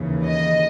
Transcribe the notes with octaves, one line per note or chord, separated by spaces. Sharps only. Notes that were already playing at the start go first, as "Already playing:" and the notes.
Already playing: D#2 C#3 E3
D#5